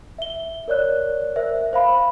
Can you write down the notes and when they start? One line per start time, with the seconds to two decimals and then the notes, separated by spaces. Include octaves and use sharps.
0.18 E5 G7
0.68 A#4 C#5 D5 F#6
1.36 A#4 C5 E5
1.73 C5 F5 B5